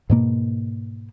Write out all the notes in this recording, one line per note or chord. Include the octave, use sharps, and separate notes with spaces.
G#2 B2 A#3